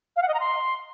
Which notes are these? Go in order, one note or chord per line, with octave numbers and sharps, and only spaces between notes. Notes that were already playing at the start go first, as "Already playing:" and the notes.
F5
F#5
D#5
A#5
C6